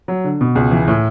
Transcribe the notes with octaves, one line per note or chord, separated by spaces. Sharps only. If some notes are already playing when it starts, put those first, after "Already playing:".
F#3
D3
B2
C#2
E3
A2